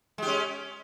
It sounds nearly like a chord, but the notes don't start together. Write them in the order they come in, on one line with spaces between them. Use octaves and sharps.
G#3 G4 C#4